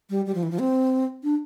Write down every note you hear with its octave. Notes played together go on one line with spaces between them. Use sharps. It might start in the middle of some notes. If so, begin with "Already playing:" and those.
G3
G3
F3
E3
F3
C4
D4